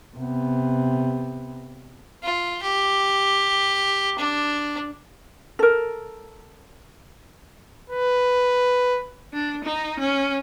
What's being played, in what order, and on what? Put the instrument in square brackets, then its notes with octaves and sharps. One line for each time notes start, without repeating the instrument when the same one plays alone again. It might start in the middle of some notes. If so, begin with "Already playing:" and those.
[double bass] C3 B3
[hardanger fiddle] F4
G4
D4
[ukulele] A4 A#4
[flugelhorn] B4
[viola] D4
D#4
C#4